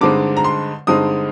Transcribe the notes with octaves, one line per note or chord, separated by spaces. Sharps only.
G2 D3 G#3 C4 D#4 D6
A#5
C6
G2 D3 G#3 C4 D#4 D#6